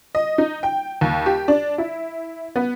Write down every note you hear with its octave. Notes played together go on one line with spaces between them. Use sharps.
D#5
D#4
G5
D#2
G4
D4
E4
B3